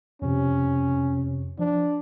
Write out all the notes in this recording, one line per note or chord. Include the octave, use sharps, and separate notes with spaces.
F2 C3 C#4
F3 D4